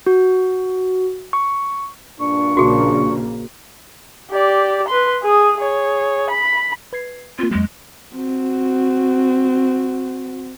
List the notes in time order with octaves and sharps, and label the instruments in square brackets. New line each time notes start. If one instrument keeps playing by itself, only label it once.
[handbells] F#4
C#6
[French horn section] G2 A#2 D4 [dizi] C#6
[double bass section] A#1 C#3 A#3 [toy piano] F#4 G#4
[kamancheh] G4 D5
B4 C6
G#4 D#6
G#4 C#5
B5
[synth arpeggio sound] B4 G#6 C7
[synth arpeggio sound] A#3 C4 [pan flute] F4
[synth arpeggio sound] F2 F#3 [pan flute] G#3
[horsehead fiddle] C4 F#4